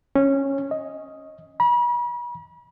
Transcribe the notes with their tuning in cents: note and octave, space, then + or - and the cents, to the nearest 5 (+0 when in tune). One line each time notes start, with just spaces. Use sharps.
C#4 -15
D#5 +5
B5 -40